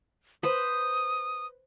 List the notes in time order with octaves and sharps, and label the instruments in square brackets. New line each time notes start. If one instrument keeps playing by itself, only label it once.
[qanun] B4 C5 B5 [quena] D#6